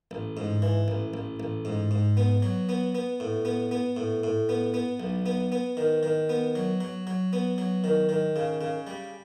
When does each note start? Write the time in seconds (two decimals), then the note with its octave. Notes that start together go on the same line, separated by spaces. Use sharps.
0.11 A1
0.37 G#2
0.62 E3
0.88 A1
1.14 A1
1.40 A1
1.65 G#2
1.91 G#2
2.17 B3
2.42 F#3
2.69 B3
2.95 B3
3.20 A2
3.45 B3
3.71 B3
3.97 A2
4.24 A2
4.49 B3
4.74 B3
5.00 B1
5.26 B3
5.52 B3
5.77 D#3
6.03 D#3
6.29 B3
6.55 F#3
6.81 F#3
7.07 F#3
7.33 B3
7.58 F#3
7.84 D#3
8.09 D#3
8.36 C#3
8.61 C#3
8.87 G3